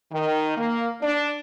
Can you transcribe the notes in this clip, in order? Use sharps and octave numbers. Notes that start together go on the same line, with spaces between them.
D#3
A#3
D4